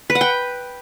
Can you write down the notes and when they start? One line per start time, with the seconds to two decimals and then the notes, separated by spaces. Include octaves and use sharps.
0.10 B4
0.15 F#5
0.21 G5